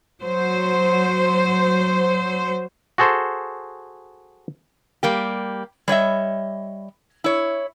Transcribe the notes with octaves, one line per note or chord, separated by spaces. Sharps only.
F#3 C5
F#4 G#4 A4 C5
G3 A#3 G4
G3 C#5 D#5 E5
E4 C#5